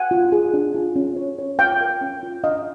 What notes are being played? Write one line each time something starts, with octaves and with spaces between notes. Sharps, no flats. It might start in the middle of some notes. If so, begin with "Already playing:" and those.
Already playing: F#5 G#5
F4
G#4
D4
F4
C#4
C#5
C#5
F4 F5 G5
A#4
C#4
F4
D4 D#5 F5